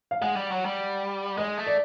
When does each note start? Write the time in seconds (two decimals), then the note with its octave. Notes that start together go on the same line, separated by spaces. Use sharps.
0.11 F5
0.21 G#3 F#5
0.36 G3
0.51 F#3
0.65 G3
1.38 G#3 D#5
1.58 A3
1.67 D5